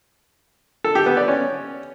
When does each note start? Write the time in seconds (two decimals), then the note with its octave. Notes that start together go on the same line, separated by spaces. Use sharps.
0.84 A4
0.95 G4
1.06 B3
1.17 D5
1.28 C#4